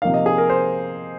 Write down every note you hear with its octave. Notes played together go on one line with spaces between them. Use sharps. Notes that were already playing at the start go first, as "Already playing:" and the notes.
C3 F3 A#3 D#4 F5
D#5
G#4
A#4
C5